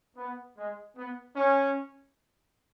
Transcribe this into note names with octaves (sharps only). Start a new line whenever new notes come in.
B3
G#3
B3
C#4